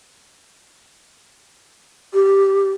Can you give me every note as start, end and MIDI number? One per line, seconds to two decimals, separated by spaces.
2.13 2.69 67